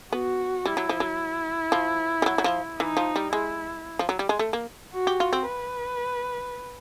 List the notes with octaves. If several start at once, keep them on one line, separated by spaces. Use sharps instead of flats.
B3 F#4
G3 E4
F#3
F3
F#3
F3
G3
F#3
F#3
F3
E3 D#4
F3
G3
G#3 E4
F3
F#3
G3
G#3
A3
A#3
F#4
G4
F4
C4
B4